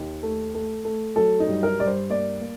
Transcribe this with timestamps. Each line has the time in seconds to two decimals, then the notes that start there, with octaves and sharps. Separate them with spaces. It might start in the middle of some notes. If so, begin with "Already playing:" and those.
Already playing: D#2 D#3
0.23 A3
0.55 A3
0.85 A3
1.16 F#3 A4
1.40 D#4
1.47 G2
1.63 A#4
1.79 G2 D5
1.87 C5
2.10 A#3 D5
2.41 A#3